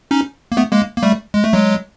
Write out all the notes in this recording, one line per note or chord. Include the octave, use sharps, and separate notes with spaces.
C#4 D#4
A#3
A3 B3
G#3 A#3
A#3
G3 A3
G#3
A3
F#3 G#3